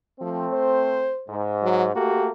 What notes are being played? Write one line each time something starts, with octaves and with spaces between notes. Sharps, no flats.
F3 A3 C4
C5
G#2
F#3
A3 A#3 F#4 G4